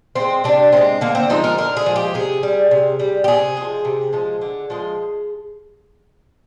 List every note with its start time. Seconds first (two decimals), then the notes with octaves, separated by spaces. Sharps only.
0.15 F3 C4
0.20 G#3
0.44 C3 D4
0.72 F3 C4
0.77 G#3
1.01 D3 A#3
1.15 C4
1.30 F3 G#3 D#4
1.44 A#4
1.58 D3 A#4
1.77 G#4
1.86 F3 G#3
1.96 G4
2.14 C3 G#4
2.43 G3
2.71 C3
3.00 G3
3.24 G4
3.28 C3 G#4
3.57 F3 G#3
3.85 C3
4.13 F3 G#3
4.41 D3
4.70 F3 G#3